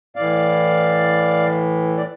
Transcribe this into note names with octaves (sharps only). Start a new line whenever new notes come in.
A2 E3 D5 F5
D5